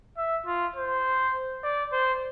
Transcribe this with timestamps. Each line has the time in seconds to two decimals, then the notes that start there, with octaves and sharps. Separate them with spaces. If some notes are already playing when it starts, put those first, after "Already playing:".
0.17 E5
0.46 F4
0.76 C5
1.63 D5
1.92 C5